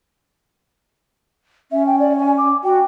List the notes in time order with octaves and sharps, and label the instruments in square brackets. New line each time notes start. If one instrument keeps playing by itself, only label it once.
[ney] C#4 [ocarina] E5
[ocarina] G5
D5
G#5
D6
[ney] F#4 [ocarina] G5